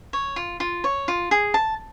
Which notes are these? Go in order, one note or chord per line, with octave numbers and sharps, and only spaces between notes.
C#5
F4
F4
C#5
F4
G#4
A5